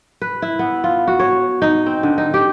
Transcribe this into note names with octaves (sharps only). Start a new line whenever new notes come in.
B4
E4
B3
F4
F#4
C#5
D#4
C4
D3
D#4
G4